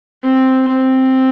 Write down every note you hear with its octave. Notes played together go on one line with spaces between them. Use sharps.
C4
C4